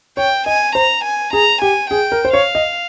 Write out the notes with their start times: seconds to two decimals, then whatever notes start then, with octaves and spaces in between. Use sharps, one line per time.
0.17 C#5 G5
0.46 D#5 G#5
0.75 C5 A#5
1.04 G#5
1.33 G#4 A#5
1.61 G4 G#5
1.90 G#4 G5
2.12 A#4
2.25 C5
2.33 C#5 F5
2.55 D#5